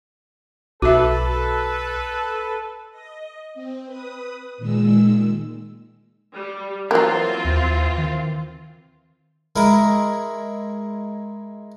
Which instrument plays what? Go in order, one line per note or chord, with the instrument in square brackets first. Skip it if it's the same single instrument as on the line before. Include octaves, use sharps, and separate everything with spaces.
[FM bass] B1 [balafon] F#4 E5 [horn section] A4 B4
[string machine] D#5
C4
B4 D#6
A#2 D#3 G#3 E6
[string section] G3
[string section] E3 C4 F4 [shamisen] F#3 A#3
[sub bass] D#2
D#3
[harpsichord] G#3 E4 A#4